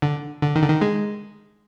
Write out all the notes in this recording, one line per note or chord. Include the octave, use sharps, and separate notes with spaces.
D3
D3
D#3
D3
D#3
G#3